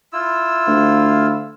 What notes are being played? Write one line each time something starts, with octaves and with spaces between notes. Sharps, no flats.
E4 F4 E6
D2 F5